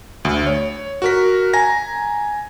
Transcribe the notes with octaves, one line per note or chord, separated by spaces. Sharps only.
D2
C#5
F#4 A#4 B6
G#5 A#5 A#6